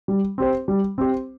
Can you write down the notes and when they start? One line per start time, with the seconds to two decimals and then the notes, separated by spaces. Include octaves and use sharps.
0.08 G3
0.38 C4 G4 C5
0.68 G3
0.98 C4 G4 C5